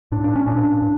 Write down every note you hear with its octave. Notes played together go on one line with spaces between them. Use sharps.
A2 D4
D4
C#4
A#2 D4
A2